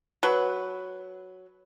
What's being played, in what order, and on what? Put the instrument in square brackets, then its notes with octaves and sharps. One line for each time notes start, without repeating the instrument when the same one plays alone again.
[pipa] F#3 B4